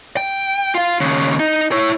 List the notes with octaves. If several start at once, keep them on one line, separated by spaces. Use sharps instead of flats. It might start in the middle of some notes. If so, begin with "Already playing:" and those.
G5
F4 F5
D#2 C#3
D#4
E4 C#5